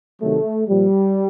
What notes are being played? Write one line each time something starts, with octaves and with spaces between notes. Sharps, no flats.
C3 D#3 F#3 A3
A#2 F3 G3